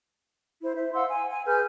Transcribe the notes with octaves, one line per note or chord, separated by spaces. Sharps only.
E4 C5
C5 E5
F5 F#5 C6 E6
G#5
G#5
G#4 B4 F6 G6